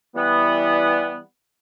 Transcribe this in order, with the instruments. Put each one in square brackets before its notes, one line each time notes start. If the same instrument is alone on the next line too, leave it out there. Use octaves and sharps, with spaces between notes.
[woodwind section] E3 G3 B3